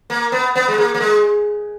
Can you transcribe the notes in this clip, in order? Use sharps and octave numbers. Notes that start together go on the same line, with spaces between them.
A#3
B3
B3
G#3
A#3
A#3
G#3